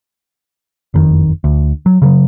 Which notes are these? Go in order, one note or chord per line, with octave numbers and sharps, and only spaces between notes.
F#1 F2 D#3
D2
F#3
C#3 F3 F#3